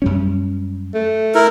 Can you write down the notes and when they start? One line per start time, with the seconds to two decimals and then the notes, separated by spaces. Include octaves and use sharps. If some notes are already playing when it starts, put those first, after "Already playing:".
0.02 F#2 G3 C#4
0.94 A3
1.35 E4 A#4